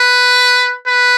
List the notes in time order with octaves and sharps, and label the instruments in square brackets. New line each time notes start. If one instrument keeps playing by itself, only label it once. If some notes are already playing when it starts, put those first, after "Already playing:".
Already playing: [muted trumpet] B4
B4